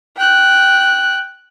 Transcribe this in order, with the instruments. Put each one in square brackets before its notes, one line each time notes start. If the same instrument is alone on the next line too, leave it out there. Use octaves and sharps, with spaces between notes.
[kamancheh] G5 F#6